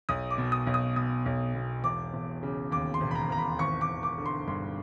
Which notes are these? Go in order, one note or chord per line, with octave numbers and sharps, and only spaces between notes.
B1 D#6
D6
B2
D#6
B1
D#6
B2 D#6
B1
B2
E1 D6
E1
C#3
D#2 D6
C6
E1
B5
A#5
E1 A#5
B5
G#1 C#6
D6
G#1
D6
D3
C6
G2 C6